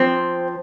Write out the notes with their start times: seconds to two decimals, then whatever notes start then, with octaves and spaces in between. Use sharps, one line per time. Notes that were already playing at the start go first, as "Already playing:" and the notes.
Already playing: F3 C4